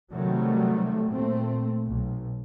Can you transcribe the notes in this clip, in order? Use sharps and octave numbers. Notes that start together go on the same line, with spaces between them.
C3 D#3 F#3 G3 A3
A#2 A3 C4
B1